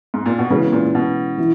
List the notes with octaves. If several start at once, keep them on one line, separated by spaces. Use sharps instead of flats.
G#2
A#2
B2
C#3 E3 G#3 C#4 F#4 B4
A#2
B2
E3